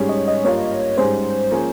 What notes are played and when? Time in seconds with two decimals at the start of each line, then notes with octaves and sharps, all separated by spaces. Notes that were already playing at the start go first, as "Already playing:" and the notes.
Already playing: G#2 G3 C#4 G#4 C#5
0.09 D#5
0.28 D#5
0.44 G2 G3 A#3 F4 C#5
0.98 G#2 G3 C#4 G#4 C5
1.51 F3 A#3 C#4 G#4